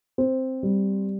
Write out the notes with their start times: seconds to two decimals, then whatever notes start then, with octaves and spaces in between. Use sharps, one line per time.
0.18 C4
0.63 G3